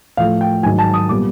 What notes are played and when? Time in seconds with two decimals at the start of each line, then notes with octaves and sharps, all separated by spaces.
0.17 A2 F3 A3 F5
0.41 G5
0.63 G#2 D#3 F#3 G#5
0.79 A5
0.94 D#6
1.09 A#2 G3 B3 D6